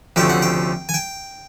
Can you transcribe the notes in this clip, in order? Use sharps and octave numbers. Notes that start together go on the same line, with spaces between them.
D2 C3 F3 A3 C#4 G5
F#5
G5
G#5
G5